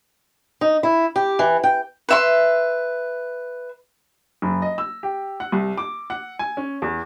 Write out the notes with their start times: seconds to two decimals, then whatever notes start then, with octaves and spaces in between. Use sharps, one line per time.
0.61 D#4
0.83 E4
1.16 G4
1.39 E3
1.64 G5
2.09 B4 E5 C6
4.42 F#1
4.62 D#5
4.78 E6
5.03 G4
5.40 F#5
5.52 C2
5.78 D6
6.10 F#5
6.39 G#5
6.57 C#4
6.82 E2